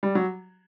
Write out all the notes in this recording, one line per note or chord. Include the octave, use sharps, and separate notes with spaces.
G3
F#3